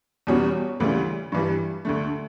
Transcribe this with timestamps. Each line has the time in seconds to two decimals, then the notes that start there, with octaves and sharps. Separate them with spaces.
0.27 E2 B2 G3 C#4 F#4
0.80 D2 C#3 E3 G3
1.32 G2 E3 G3
1.85 D2 D3 A3